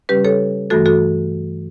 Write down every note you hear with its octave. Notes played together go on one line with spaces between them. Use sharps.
C#3 G3 C#4 G4 B4
A4 C#5
G2 E3 A3 F#4 A4
F#4 A4